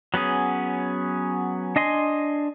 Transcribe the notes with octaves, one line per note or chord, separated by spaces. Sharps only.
F#3 B3 C#4 G#4
D4 D#5 G#5 C6